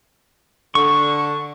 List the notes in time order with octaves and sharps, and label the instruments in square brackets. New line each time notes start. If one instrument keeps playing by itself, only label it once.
[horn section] D3 [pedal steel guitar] C#6